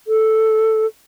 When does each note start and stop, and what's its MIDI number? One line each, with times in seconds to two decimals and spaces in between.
0.08 0.86 69